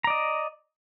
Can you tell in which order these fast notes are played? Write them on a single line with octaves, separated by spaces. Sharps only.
A#5 D5 D#5